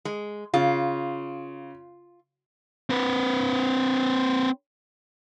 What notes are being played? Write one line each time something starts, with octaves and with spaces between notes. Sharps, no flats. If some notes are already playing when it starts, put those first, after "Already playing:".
G#3
C#3 F4
C4 B4